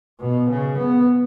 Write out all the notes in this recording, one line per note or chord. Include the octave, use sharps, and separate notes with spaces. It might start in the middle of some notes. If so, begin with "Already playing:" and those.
B2
C#3
B3